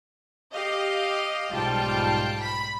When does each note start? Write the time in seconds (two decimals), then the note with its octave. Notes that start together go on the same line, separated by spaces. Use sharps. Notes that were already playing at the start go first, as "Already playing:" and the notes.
0.52 G4 D#5 F5
1.51 B1 G#2 G3 F4 G5 A5
2.41 B5 B6